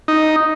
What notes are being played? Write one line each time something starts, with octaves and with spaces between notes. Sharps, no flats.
D#4